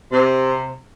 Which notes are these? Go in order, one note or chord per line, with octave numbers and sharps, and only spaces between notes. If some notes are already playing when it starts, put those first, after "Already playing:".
C3